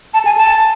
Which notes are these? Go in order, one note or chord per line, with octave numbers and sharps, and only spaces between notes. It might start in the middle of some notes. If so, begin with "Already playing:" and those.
A5
G#5
A5